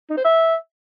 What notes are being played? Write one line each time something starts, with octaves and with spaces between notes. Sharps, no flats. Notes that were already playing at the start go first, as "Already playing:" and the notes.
D#4
C5
E5